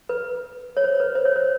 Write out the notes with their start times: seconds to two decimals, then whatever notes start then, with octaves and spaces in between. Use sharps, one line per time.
0.09 B4
0.77 C#5
0.84 C5
1.00 B4
1.15 C5
1.25 C#5
1.36 C5